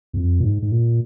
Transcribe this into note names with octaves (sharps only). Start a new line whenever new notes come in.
E2
F2
A#2
G#2
G#2
A#2